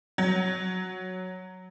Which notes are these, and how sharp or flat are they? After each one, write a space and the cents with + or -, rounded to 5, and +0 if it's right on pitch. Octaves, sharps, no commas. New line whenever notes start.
F#3 -5